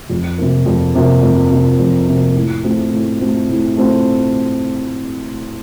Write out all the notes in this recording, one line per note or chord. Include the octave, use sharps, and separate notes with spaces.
F2
C3 F3 A#3
F2
C3 F3 A#3
F2
C3 F3 A#3
F2
C3 F3 A#3
A2
A3 C4 F4
A2
A3 C4 F4
A2
A3 C4 F4